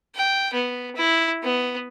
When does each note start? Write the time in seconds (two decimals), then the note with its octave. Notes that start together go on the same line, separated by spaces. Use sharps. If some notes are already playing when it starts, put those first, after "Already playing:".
0.15 G5
0.54 B3
0.96 E4
1.43 B3